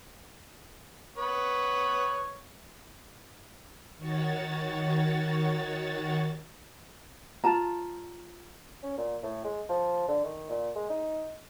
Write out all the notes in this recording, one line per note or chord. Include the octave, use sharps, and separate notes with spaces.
B4 C#5 D#6
D#3 F#4 C#5 A6
F4 A5 A#5
C#4
A#2
A2
G#3
F3
D3
D#3
A#2
G#3
D#4